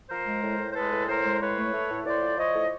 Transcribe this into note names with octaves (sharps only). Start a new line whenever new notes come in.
F3 A#4 C5
G#3
A2
A2
C5
G#3 A4 B4
A2
A2 A#4 C5
G#3
A2 B4 C#5
A3
A3
A2
A2 C5 D5
F3
F3 C#5 D#5
A2